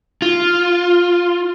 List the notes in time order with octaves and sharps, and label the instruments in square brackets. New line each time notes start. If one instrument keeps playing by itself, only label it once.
[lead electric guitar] F4